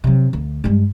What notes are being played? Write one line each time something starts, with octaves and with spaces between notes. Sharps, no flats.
C3 F#3
D2
G2 G#3